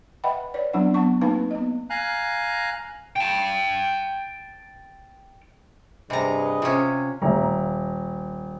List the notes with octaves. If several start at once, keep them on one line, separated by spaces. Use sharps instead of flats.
B4 D#5 E5 F#5 G5 B5
B4 C#5 D5
F#3 B3 C4 D4 D5 F#5
B3 F#5 A5 C#6
A#3 C4 D#4 B4 F5 A5
B3 D#5
F5 G#5 A#5 F#6
G5 A5
G2 C3 G#4 B4 D#5 A#5
C3 C#4 F4
D#1 E5 A#5